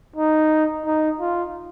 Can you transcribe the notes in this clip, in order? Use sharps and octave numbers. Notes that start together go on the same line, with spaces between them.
D#4
D#4
F4